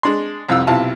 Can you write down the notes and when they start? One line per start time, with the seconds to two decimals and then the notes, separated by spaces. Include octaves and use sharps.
0.03 G#3 D4 C6
0.49 C2 F2 F4 E6
0.67 B1 C3 E4 F4 A5